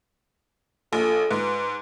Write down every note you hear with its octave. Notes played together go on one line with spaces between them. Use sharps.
A#1 A4
G#2 B4